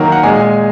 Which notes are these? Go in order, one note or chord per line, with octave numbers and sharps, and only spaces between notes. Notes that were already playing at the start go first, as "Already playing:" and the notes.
Already playing: D#3 F#3 A#3
F#5
A#2 G#3 G#5